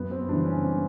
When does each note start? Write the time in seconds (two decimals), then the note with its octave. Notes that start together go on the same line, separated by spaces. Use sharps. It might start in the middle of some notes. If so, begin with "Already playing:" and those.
Already playing: F#2 B3
0.11 C4
0.29 C#3 E3 G3 D4
0.46 C#4
0.64 C4